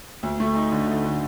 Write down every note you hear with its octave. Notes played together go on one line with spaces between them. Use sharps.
D2
A3
D#4
D3
A3
D3